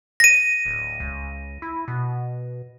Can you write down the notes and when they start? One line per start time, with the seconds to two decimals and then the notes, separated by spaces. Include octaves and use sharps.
0.20 A#6 D#7
0.65 D1
1.00 C#2
1.62 E4
1.88 B2